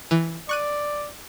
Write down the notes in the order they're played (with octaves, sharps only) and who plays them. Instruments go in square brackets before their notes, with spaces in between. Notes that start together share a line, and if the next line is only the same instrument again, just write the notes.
[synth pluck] E3
[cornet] D5 [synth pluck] C#6 F#6 D#7